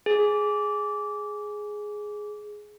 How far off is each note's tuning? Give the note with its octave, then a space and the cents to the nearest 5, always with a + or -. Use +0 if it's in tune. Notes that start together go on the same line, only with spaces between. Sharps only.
G#4 +5